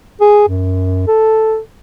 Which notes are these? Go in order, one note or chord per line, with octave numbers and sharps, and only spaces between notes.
G#4
F#2
A4